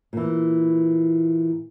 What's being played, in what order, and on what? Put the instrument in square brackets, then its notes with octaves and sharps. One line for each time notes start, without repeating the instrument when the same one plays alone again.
[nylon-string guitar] A#2 E3